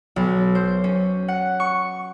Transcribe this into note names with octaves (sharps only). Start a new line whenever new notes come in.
B1
C5
C#4
F#5
C#6